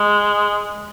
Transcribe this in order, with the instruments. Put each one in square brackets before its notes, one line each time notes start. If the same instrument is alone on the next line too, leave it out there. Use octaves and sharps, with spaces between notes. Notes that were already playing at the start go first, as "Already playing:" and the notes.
Already playing: [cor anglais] G#3